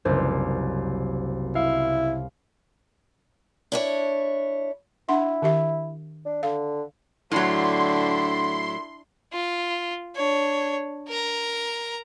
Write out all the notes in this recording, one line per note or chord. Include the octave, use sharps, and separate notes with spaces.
F#1 C2 C5
E4 F5
D4 E4 C#5
D4 E4 F#5 C6
D#3 G4 E5
D4
D3 F5
A2 D3 F#3 D4 E4 C6
F4
D4 C#5
A#4 A#5